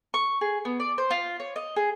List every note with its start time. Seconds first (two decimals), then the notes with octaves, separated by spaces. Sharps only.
0.14 C#6
0.41 G#4
0.65 B3
0.80 D5
0.98 C5
1.11 F4
1.40 C#5
1.56 D#5
1.76 G#4